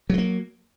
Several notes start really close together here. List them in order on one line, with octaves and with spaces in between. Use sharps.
F#3 G#3 A#3